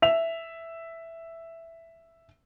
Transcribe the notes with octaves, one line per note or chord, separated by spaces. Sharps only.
E5 F7